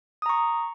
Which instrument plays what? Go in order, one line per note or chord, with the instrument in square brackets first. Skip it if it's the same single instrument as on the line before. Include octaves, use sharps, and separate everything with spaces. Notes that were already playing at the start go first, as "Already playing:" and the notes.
[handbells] D#6
A#5
C#6